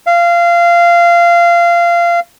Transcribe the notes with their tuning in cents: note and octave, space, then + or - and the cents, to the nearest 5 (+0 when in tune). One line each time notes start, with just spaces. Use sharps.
F5 -20